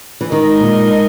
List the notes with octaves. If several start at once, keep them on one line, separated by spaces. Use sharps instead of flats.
E3
D#3 G#3 D#4 A#4 D#5
A#2